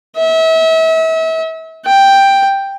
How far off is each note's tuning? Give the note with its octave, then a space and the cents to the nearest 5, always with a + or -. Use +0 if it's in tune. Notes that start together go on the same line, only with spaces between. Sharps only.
E5 -35
G5 +5